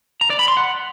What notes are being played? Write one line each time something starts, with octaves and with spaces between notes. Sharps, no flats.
A#5
D5
B5
C6
F#5